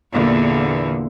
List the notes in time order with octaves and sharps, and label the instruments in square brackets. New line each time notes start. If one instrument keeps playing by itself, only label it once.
[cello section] E2 A#2 D3